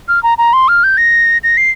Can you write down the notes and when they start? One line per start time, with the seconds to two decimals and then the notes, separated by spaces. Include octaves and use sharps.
0.08 F6
0.23 A#5
0.38 A#5
0.53 C6
0.68 F6
0.84 G6
0.97 A#6
1.44 A#6
1.57 C7